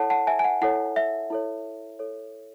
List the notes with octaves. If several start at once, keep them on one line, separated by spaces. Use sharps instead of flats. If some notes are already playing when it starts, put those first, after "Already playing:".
Already playing: E4 A4 C#5 F#5 A5
F#5 A5
E5 G#5
G#5
F#5
E4 A4 C#5 F#5
E5
E4 A4 C#5
E4 A4 C#5